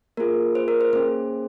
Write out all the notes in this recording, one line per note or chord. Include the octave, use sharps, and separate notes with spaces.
A#3 F4 G#4 A#4
C5
A#4
C5
A#3 C#4 G#4 C5